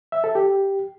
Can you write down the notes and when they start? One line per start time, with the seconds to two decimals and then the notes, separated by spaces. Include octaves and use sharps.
0.12 E5
0.24 A4
0.35 G4